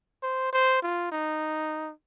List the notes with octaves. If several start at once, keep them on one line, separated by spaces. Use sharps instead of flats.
C5
C5
F4
D#4